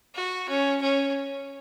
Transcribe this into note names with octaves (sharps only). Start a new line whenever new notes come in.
F#4
C#4
C#4